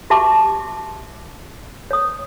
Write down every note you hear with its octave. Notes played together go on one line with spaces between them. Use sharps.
F#4 G4 E5 A5 C#6 D6
C#5 D#6